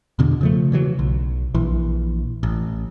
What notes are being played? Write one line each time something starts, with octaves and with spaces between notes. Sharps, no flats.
E2 B2 D3
C#3 F3 A3
C#3 E3 F#3
B1
A#1 E3
A1